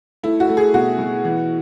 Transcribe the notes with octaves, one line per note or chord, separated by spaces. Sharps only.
A3 E4
F#4
A3
G#4
B2 F#4
B2
E3